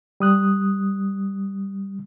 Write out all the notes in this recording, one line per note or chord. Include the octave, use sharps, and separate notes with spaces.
G3 D#6 F#6